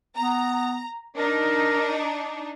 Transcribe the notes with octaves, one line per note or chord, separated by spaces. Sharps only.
B3 A#5
D4 D#4 A#4